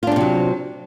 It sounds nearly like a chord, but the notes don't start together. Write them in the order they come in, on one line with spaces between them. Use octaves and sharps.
F4 D4 C4 C3 F#3